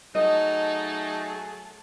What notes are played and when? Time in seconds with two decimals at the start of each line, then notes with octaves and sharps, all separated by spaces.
0.15 F#3 A3 D#4 G#4 A4 D#5